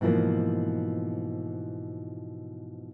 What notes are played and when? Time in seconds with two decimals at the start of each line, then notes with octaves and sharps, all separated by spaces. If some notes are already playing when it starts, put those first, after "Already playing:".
0.01 G#2 B2 E3 F3 A#3